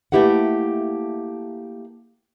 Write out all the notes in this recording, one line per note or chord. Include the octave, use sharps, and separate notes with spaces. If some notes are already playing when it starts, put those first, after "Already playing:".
A3 A#3 E4 G4 B4 F#5